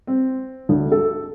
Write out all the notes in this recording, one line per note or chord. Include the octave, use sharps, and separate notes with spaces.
C4
D2
A4